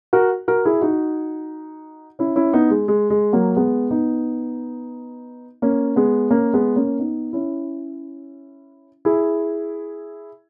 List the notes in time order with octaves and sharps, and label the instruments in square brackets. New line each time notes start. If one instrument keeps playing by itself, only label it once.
[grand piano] F#4 A#4
F#4 A#4
E4 G#4
D#4 F#4
C#4 E4
C#4 E4
B3 D#4
G#3
G#3
G#3
F#3 A#3
G#3 B3
B3 D#4
A#3 C#4
G#3 B3
A#3 C#4
G#3 B3
A#3 C#4
B3 D#4
C#4 E4
E4 G#4